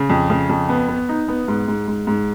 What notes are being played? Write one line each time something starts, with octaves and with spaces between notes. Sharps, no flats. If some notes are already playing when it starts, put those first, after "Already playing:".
Already playing: C#3
F2
C#3
F2
B3
B3
D#4
B3
G#2
G#2
G#2
G#2